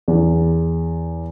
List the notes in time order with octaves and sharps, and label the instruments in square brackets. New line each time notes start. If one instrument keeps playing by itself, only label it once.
[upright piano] E2